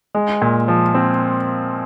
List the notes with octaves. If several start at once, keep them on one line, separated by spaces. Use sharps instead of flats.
G#3
A#2
F3
C4